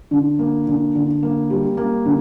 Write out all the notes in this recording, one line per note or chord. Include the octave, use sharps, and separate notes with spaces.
D3
A#3
D3
D3
A#3
G3
A#3
D3